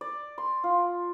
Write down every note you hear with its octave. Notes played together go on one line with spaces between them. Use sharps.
D5
C6
F4